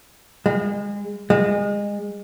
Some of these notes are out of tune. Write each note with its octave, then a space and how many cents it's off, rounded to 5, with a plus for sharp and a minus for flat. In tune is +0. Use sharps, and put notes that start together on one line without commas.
G#3 -30
G#3 -25